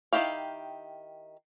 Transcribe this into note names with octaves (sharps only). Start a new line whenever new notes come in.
D#3 F#3 E4 G4 F5